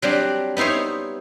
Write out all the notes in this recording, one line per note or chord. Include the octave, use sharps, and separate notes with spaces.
F#3 G3 C4 D4
B3 D#4 E4 C5 C#5